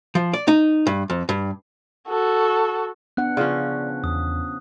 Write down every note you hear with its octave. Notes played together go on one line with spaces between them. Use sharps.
F3
D5
D#4
G2
F2
G2
F#4 A4
B3 D4 F#5 F#6
C#3 F3 C#4 D5
E2 D#6